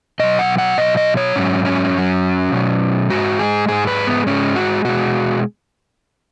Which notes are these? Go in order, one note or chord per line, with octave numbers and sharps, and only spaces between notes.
B2 F#3 D#5
F#5
F#5
B2 F#3 D#5
D#5
C#5
G#2 F#3 C#4
C#4
F#2 F#3
B2 F#3
G#2 G#3 F#4
G#4
G#2 G#3 G#4
B4
B3
G#2 G#3 C#4
F#4
B2 G#3 F#4